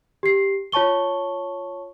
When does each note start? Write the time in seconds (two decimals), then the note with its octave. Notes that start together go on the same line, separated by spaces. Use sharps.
0.23 G4 C7
0.72 F4 C#5 A5 C#6 G7